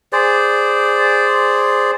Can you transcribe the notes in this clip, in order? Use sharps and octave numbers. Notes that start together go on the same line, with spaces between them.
G#4 C5 D5